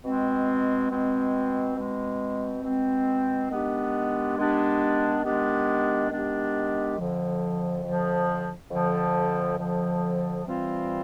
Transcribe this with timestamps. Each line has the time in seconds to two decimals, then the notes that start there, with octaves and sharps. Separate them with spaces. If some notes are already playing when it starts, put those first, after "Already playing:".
0.04 B2 G#3 C4
0.91 B2 G#3 C4
1.77 B2 G#3 C4
2.64 B2 G#3 C4
3.50 D#3 G#3 B3 D4 G4
4.37 D#3 G#3 B3 D4 G4
5.23 D#3 G#3 B3 D4 G4
6.11 D#3 G#3 B3 D4 G4
6.98 F2 D3 F3
7.84 F2 D3 F3
8.70 F2 D3 F3
9.58 F2 D3 F3
10.44 C3 E3 G3 C4 F4